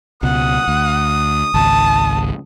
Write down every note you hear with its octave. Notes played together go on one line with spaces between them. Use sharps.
C#2 B2 F#5 D#6
D2
G#1 C#2 A5